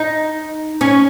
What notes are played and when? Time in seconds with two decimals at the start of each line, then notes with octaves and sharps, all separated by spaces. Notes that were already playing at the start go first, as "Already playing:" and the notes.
Already playing: D#4
0.81 C#4